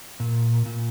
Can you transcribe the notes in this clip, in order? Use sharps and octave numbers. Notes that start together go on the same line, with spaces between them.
A#2
A#2